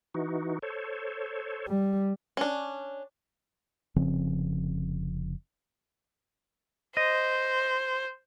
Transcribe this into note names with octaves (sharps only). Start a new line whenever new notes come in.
E3 D#4 F#4
A4 C5 C#5
G3
C#4 D4
F1 C#3 F3 C4
C5 D#5